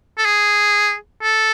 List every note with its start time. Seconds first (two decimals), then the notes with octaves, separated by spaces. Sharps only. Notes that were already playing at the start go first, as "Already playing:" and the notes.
0.18 A4
0.25 G#4
1.23 A4